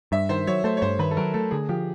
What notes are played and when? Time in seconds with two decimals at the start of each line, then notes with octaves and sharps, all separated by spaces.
0.12 G2 E5
0.29 D#3 C5
0.47 F#3 C#5
0.64 A3 C5
0.77 C#5
0.82 G2 C5
0.99 D#3 B4
1.11 A4
1.17 F#3 A#4
1.34 A3 A4
1.51 D3 G#4
1.69 F3 G4